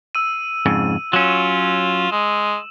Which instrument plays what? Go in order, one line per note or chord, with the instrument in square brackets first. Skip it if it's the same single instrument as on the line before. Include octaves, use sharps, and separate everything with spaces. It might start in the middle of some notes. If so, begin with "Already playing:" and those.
[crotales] E6 D#7
[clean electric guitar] F2 G#2 C#3
[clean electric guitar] F#3 C#4 [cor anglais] F4 [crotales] E7 F#7
[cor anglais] G#3